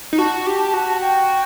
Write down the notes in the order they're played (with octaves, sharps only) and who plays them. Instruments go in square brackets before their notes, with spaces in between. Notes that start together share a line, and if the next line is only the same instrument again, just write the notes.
[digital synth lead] D#4
[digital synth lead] F#4 [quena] A5
[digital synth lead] G4
F#4
[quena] G5